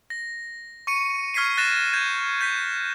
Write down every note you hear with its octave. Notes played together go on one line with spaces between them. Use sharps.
A#6
C#6 C#7 D#7
C#6 F6 G#6 B6 C7 D#7
F#6 A6 A#6 E7
G6 G#6
G6 G#6 B6